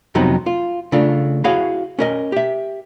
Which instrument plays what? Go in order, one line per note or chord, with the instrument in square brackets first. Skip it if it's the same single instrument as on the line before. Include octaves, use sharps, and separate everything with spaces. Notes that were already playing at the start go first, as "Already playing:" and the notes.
[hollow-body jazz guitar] F2 C3 F#3 B3 D#4
F4
C#3 A3 D4 F4
E4 F#4 G#4 C#5 F5
C#4 A#4 D#5
G4 E5